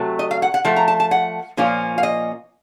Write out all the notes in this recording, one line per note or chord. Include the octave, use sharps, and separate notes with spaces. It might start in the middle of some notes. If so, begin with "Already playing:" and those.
Already playing: C3 F#3 A3
D#5
F5
F#5
F#5
F3 A3
A#5
A5
A5
F#5
A#2 F3 A#3 C#4 F4
F5
D#5